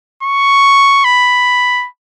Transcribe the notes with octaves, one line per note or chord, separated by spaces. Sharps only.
C#6
B5